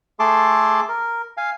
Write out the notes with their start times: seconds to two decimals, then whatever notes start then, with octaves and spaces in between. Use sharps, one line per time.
0.19 A3 G#4 A4 A5 C6 D6
0.89 A#4
1.37 F5 G#5